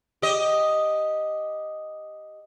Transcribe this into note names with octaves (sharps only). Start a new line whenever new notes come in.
G4 D#5